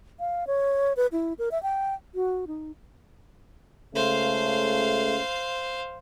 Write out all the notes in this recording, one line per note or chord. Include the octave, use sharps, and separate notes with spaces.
F5
C#5
B4
E4
A#4
E5
G5
F#4
D#4
C#2 C#3 A3 C5 F5